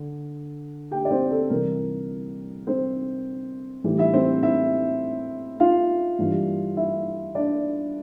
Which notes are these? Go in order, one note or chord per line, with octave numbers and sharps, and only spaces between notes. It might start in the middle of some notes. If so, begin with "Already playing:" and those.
Already playing: D3
G4 G5
D5
C4 C5
A4
C2 C3 E3 A#4
C4 C5
A2 E3 G3
E4 E5
C4 C5
E4 E5
F4 F5
G2 E3 G3
E4 E5
D4 D5